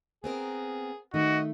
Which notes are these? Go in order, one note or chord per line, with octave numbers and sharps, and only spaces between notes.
B3 C4 G#4 A#4
D#3 A3 F#4 D#5